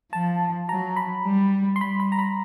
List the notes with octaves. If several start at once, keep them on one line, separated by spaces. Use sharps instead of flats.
F3 A5
F#3 A#5
B5
G3
C6
G3 B5
B5
A#5
B5